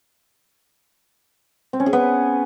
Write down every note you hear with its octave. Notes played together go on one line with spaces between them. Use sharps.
C4
C#4
G#4
B3